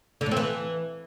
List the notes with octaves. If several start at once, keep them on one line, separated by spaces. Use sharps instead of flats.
D3
A2
C4
E3